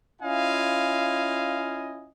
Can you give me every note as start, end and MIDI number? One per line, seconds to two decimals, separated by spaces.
0.22 2.08 61
0.22 2.08 64
0.22 2.08 65
0.22 2.08 75
0.22 2.08 77
0.22 2.08 80